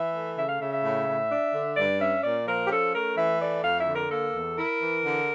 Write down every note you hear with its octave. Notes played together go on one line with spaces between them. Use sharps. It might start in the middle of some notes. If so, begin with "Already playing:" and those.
Already playing: E3 E5
A3
C#3 E5
F5
C#3 E5
E5
A2
A2
D4
D3
G2 D5
C#4 E5
A#2 D5
F3 A#4
G4
C#4 A4
A3 A#4
E3 E5
A3 D5
F2 F5
E5
D3
A#4
A#3 A4
E2
E4 A#4
E3
D3